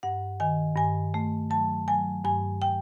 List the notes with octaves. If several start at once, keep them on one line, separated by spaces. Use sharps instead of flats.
G2 F#5
D#3 G#5
G2 G#5
A3
F#3 A5
F#3 G#5
G2 G#5
G5